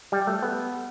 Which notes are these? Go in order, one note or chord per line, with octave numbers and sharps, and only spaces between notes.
G3
A3
B3